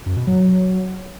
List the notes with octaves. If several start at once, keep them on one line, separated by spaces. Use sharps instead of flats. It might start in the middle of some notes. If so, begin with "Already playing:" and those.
F#2
B2
F#3